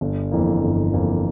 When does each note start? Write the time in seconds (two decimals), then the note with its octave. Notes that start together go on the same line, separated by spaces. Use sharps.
0.01 G1
0.31 F2 E3 A#3
0.63 G1
0.93 F2 E3 A#3